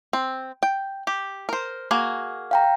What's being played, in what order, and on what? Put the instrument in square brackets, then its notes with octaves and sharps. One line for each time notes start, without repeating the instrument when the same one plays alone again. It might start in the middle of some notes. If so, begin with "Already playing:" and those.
[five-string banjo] C4
G5
G4
A#4 C5
A#3 F#4 G#4
[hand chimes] F5 G5 A#5